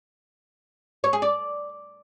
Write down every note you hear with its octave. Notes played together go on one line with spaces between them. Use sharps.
C#5
G#4
D5